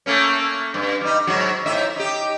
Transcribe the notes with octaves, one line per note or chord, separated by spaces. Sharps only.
A3 A#3 C#4
G2
G3 D#4
G#2 F#3 F#4
A2 D#4 E5
D#4 G4